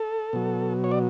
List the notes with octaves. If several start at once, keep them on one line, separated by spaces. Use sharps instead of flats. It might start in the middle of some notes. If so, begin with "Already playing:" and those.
Already playing: A4
B2 F#3
C#5
D5